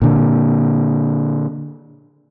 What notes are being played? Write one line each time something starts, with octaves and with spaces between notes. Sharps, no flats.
A#2 D3